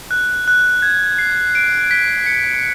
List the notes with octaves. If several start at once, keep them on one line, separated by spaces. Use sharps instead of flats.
F#6
F#6
G#6
C7
D7
B6
C#7